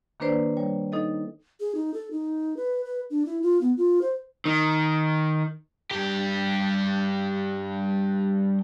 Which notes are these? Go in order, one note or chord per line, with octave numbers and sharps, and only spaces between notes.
D#3 A#3 D4 B4 C5 D5
G3 C#5
D#4 A4 D#5
G#4
D#4
A4
D#4
B4
B4
D4
E4
F4
B3
F4
C5
D#3
G2 G4